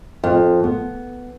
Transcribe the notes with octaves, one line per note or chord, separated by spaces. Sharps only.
F2
B3